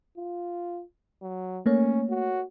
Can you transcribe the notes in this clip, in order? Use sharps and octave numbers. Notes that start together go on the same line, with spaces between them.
F4
F#3
A3 A#3 C#4 C#5
F#4